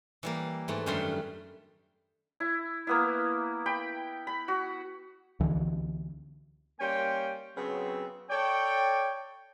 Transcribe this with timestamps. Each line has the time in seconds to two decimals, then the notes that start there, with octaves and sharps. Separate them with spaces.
0.23 E3 G3 A#3
0.68 G#2 A3 B4
0.86 F#2 D#3 G3 A3 D4 C6
2.40 E4
2.87 A#3 B3 E4
3.66 G5 B5
4.27 B5
4.48 F#4
5.40 C#2 D3 E3
6.80 G3 A#3 C#4 G5 C6
7.57 C#3 F#3 B3 C4
8.30 A4 C#5 D5 G5